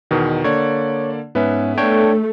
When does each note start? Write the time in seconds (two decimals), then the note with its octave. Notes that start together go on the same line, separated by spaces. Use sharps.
0.11 E2 B2 D#3
0.44 D3 A#3 C#5 D5
1.35 G#2 B3 C#4 B4 E5
1.78 A3 D4 C#5 G5